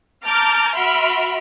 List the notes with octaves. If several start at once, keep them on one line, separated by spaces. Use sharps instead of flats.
A5 A#5 D6 F6 G6
F#4 E5 B5 C6 F6 D7